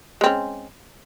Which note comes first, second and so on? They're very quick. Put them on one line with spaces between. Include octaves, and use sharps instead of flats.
G#3 C4 C#4